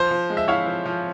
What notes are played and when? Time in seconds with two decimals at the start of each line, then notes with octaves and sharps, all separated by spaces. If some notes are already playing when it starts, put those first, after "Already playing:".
Already playing: F3 C5
0.11 F3
0.30 G#3
0.37 E5
0.48 E4 C#5 F5
0.66 F3
0.86 F3